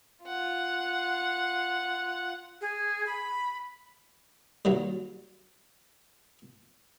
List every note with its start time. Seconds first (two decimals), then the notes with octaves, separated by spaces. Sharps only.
0.24 F4 F#5
2.61 G#4
3.07 B5
4.65 D#2 F#3 G3